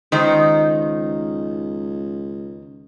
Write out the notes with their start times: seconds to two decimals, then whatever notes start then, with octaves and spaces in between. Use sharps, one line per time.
0.12 C#2 D#3 D#4 C5